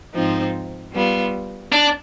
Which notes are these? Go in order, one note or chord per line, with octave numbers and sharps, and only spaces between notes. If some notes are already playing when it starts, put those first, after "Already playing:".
G#2 F3 C4 D#4
G3 B3 F4
D4